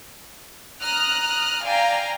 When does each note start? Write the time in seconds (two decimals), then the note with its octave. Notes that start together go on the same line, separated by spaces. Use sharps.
0.81 A#5 D#6 F6 F#6
1.64 D5 F5 G5 G#5 A#5